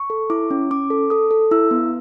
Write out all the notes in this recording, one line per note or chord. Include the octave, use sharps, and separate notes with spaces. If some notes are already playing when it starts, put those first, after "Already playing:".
Already playing: C#6
A4
E4 D6
C#4
C#4 D6
A4
A4 D#6
A4
E4 E6
B3